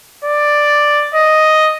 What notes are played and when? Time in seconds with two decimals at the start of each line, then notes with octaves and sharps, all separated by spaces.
0.25 D5
1.15 D#5